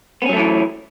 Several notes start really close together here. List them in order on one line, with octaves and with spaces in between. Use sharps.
B3 C#4 F#3 A3 E3